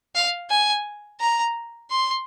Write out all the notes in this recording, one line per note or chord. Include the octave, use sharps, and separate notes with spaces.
F5
G#5
A#5
C6